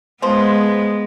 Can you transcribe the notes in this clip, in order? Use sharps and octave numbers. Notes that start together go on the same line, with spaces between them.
F3 G#3 B3 C5